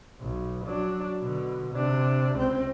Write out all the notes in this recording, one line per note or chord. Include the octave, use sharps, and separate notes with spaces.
B1
F#3 D4
B2 D3
C3 D4
C#2 C4